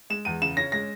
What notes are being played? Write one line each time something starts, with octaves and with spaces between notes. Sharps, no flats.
G#3 E7
E2 D#7
C#3 E7
C#4 A#6
G#3 A#6